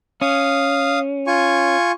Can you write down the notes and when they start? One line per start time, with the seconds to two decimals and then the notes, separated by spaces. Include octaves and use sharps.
0.21 C#4 F5 D#6
1.27 F4 G#5 C#6